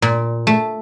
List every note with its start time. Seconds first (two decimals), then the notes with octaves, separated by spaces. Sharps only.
0.02 A#2
0.47 A3